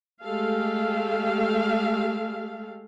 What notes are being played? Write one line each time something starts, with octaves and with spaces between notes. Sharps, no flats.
G#3 A3 G4 A4 F5